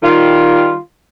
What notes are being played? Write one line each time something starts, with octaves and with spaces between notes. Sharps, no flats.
D#3 G3 F4